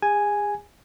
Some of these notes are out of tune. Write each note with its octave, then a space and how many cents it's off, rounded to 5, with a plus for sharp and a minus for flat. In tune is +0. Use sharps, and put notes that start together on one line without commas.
G#4 -40 G#5 +0